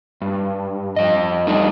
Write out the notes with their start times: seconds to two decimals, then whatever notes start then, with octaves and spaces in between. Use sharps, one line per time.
0.22 G2
0.96 F2 D#5
1.47 G3 A3 D4 D#4